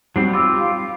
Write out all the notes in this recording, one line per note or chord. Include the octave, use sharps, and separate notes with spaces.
F#3 G3 C4 D#4 F#5 C7
F4 G4 B5 D6 E6
F5